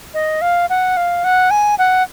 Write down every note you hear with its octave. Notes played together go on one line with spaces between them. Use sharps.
D#5
F5
F#5
F5
F#5
G#5
F#5